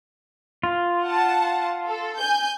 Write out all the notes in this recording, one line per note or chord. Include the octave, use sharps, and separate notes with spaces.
F4
F#5 A5
A4
G#5 G6